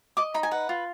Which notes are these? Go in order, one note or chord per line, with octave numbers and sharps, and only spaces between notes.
D#5 D6
D#4 B5
G#5
B4 F#5
F4